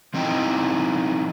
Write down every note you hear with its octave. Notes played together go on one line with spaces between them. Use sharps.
F3 C4 D#4 E4 G5